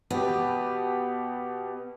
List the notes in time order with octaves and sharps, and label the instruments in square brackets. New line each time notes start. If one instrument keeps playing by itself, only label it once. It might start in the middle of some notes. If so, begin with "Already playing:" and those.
[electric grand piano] B2 G4 [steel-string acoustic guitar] B3